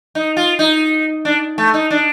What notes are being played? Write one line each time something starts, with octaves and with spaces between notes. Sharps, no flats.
D#4
F4
D#4
D4
A3
D#4
D4